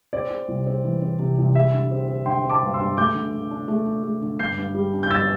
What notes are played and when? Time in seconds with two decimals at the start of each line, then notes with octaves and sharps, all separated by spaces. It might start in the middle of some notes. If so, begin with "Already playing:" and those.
0.13 C4 D5
0.30 C4
0.48 C2
0.66 C4
0.84 E3
1.01 C4
1.19 C3
1.38 C2
1.55 G3 E5
1.73 D3
1.91 C4
2.08 C4
2.26 D3 G5 C6
2.44 C4
2.49 A5 D6
2.62 G2
2.74 C6 E6
2.80 G2
2.97 A3 D6 G6
3.15 D3
3.33 D3
3.51 D4
3.68 A3
3.86 D4
4.03 A3
4.22 D3
4.39 G1 G6 C7
4.58 G2
4.74 G3
4.93 D4
5.03 G6
5.10 G1 E6 A6